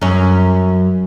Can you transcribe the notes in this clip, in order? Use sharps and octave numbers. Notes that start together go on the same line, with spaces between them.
F#2 C#4